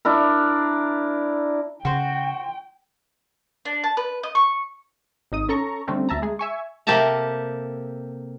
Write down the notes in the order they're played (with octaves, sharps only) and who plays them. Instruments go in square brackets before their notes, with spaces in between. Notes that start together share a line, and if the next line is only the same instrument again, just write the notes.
[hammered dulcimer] D4 E4 A#4
[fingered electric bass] C#3 [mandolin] F#4 C5 [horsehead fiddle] G5
[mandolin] D4
A5
B4
D#5
C#6
[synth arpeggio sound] G#1 D#4 D#6
C#4 A4 A#5 C#6
D3 G3 A3 C4 C#4
D2 E5 A5 A#5
G#3 G#4
E5 G#5 C#6
[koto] C3 A#3 G4 A4 A5 A#5